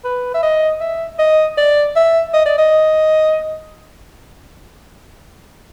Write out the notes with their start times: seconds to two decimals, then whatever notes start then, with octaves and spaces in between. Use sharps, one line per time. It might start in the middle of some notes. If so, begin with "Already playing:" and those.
0.05 B4
0.35 E5
0.43 D#5
0.81 E5
1.19 D#5
1.58 D5
1.96 E5
2.34 D#5
2.46 D5
2.59 D#5